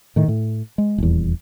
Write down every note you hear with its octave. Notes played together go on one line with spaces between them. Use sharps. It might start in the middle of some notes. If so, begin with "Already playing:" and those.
A2 D#3
A2
G#3
D#1 E2